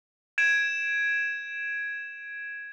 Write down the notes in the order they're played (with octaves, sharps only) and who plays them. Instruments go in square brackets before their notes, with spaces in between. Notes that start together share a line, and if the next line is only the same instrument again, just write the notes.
[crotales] G#6 D7 E7